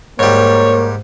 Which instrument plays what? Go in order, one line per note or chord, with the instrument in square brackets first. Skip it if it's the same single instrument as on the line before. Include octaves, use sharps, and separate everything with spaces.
[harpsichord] G#2 G3 [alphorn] A#3 [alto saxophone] C#5